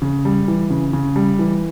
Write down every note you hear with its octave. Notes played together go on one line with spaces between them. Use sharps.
C#3
G3
E3
C#3
C#3
G3
E3